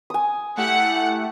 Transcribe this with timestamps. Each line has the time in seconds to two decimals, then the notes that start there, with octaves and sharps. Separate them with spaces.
0.10 G#5 D#6
0.58 A3 E4 G4 F#5